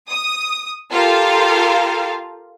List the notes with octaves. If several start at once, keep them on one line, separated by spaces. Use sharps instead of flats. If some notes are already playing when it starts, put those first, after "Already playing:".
D#6
F4 G4 A4 A#4 F5